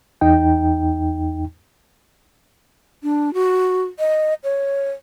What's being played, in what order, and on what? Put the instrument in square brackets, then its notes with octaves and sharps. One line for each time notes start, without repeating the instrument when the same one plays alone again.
[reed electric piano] E2 D#4 G5
[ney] D4
F#4
D#5
C#5